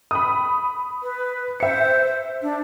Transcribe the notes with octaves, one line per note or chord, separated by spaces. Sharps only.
B5 D#6
B4
C5 E5 C#7
D4